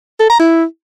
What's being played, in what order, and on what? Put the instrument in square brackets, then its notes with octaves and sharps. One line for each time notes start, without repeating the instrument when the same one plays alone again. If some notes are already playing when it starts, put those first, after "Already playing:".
[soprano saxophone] A4
A#5
E4